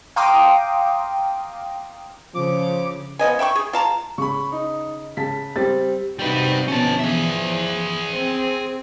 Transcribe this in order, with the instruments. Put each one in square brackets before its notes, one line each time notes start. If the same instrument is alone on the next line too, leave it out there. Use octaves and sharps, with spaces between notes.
[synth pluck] F5 G5 A#5 C6 D6 D#6
[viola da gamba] C#3 [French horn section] F3 [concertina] D6
[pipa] F3 B3 D#5 G#5
E5 G5 B5 C#6
G#4
F4 A5 A#5
[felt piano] C#3 [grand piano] B5 C#6
[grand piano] D#4
[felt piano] C#3 A5 [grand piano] B6
[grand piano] G3 [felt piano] C4 A6
[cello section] C3 D#4 F#4 [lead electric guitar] G3 B4
[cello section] B2 D3 F3 [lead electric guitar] C#4 A5
[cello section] E3 F3 [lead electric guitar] G#4 E5
[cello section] C4